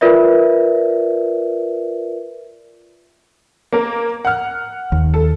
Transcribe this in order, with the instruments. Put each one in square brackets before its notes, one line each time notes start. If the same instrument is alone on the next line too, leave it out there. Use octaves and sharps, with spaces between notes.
[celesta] F4 A#4 B4 D5 E5
[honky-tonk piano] A#3 A#4
F#5 F6
[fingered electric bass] D#2
[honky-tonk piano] A4